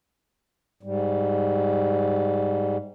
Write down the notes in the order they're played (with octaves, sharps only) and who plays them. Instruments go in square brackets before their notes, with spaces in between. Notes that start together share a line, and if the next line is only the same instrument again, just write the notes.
[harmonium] G#2 G3